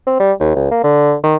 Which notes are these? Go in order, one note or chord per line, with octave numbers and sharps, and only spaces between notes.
C4
G3
D#2
C#2
A#3
D3
D#3